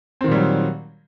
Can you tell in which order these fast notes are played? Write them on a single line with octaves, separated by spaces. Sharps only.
C4 D#3 A#2 G3 F#3